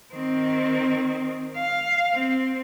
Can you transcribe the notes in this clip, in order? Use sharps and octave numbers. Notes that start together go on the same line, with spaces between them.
D#3 C4
F5
C4